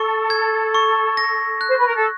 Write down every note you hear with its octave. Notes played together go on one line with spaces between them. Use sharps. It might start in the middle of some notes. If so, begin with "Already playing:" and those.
Already playing: A4 C#6
G#6
C#6
A#6
F#6
C5
B4
A#4
A4